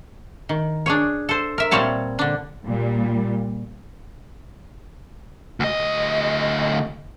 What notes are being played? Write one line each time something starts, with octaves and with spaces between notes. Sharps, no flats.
D#3
D4 G#4 C#5
A4 C5
A#4 E5
A#2 G3 C4 C#5 A5
D3 D4
A#2 G3
D2 D#5